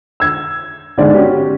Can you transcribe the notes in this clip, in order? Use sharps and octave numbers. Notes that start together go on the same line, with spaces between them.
E6 G#6
G1 G#2 G#3 D5
C#4 F#4 G4